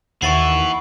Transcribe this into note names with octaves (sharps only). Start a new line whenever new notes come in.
D#2 E3 E4 F#5 C#6 A6 C7